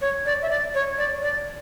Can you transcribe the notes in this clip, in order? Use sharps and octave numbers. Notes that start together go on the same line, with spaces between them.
C#5
D5
E5
D5
C#5
D5
D5